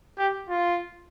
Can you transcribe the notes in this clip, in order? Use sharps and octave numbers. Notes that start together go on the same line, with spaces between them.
G4
F4